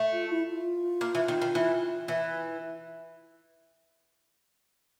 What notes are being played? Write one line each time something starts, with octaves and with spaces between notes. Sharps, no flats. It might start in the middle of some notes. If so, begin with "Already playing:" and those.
Already playing: A3
F4
E4
F4
A#3
E3
D#3
D#3
E3
E3